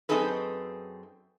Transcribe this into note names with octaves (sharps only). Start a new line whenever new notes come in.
F#2 C4 D#4 G#4 A4 B4